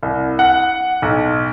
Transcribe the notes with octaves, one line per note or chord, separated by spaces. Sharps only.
C2
F#5
B1